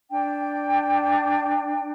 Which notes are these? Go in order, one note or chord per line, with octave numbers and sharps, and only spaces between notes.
D4 G5